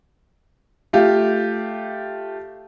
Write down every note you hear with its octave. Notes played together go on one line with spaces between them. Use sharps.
A3 F4 G4